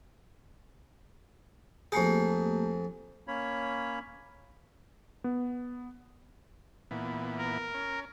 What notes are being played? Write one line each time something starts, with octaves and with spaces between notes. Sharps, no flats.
F2 A3 A#3 G4 G#4
A#3 C#4 C#5 B5
B3
A#2 E3 B3
A#4
C#4